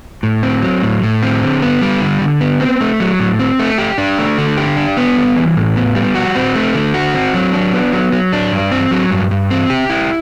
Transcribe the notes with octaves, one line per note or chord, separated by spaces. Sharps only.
A2
C4
F#3
A2
A2
C4
D3
B3
G3
D3
D3
B3
C4
A3
F#3
A2
C4
A3
G4
D4
A3
D3
G4
D4
B3
G3
E3
A2
B3
G3
F#4
C4
A3
D3
F#4
C4
F#3
D4
B3
F#3
F#3
D4
G2
C4
F#3
G2
G2
C4
G4
E4